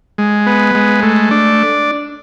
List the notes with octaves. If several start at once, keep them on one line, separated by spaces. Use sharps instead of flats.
G#3
B3
G#3
A3
D4